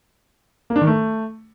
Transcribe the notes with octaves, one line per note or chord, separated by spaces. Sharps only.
A#3
D4
D#3
A3